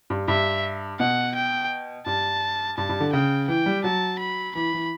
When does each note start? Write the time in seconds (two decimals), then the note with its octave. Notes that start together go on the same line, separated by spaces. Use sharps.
0.10 G2
0.28 G2 E5
1.00 B2 F#5
1.35 G5
2.06 G2 A5
2.78 G2 A5
2.89 G2
3.00 D3
3.13 C#3 G5
3.48 E3 G5
3.66 G3
3.84 F#3 A5
4.19 B5
4.55 E3 B5
4.73 E3